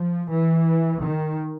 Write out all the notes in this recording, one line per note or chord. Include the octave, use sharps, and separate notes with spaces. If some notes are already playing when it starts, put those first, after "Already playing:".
Already playing: F3
E3
D#3